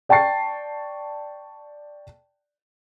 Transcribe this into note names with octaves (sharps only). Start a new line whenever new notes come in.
D5 G5 A5 C#6 A6 C7